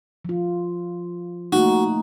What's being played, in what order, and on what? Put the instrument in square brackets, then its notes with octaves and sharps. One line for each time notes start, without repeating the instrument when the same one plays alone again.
[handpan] F3 F4
[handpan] A3 A#3 D#4 [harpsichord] F#4